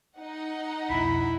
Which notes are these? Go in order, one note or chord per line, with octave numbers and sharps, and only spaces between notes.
D#4 F#5
C2 F2 B2 E4 B5